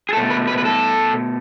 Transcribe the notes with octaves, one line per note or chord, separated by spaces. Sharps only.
G#4
B2 A3 A4
B4
B4
B4
A4